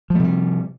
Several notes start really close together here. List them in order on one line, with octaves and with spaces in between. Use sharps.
F3 A3 C3 G3